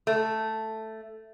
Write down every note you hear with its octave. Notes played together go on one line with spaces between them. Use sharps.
A3